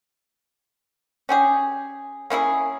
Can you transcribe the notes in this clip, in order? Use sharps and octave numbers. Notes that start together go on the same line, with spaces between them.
C#4 G4 G#4
A#3 C#4 E4 G#4